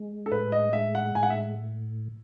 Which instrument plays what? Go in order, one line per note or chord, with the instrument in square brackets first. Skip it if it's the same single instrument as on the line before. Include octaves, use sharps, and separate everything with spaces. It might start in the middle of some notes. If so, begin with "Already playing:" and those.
Already playing: [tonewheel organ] G#3
[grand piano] A4
[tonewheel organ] A2 [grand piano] B4
[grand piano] D#5
[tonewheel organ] G#3 [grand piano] E5
[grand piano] F#5
[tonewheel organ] A2 [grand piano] G#5
[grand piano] F#5
E5